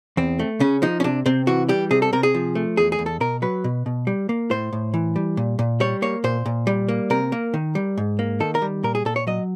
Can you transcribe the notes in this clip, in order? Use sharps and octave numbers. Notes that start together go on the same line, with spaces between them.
E2 C4
A3
C#3 C#4
F3 D#4
C#4
C3 D4
C3 C4
E3 F#4
G3 G4
C3 G#4
A4
C3 A#4
G#4
F3
A3
E2 G#4
G#4
E2
A4
B2 A#4
F#3 B4
B2
B2
G3
A#3
A2 C5
A2
E3
G3
A#2
A#2
G3 C#5
A#3 C#5
A#2 C5
A#2
G3
A#3
C3 A#4
A#3
D#3
G3
G#2
A#3
D#3 A4
A#4
G3
A#2 A#4
G#4
A#2 A4
C#5
F#3 D#5